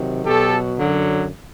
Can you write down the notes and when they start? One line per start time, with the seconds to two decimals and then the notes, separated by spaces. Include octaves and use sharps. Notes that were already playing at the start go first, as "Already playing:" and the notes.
Already playing: C3 D#3 F#3
0.26 B2 F#3 G4 A4
0.77 F#2 D3 F#3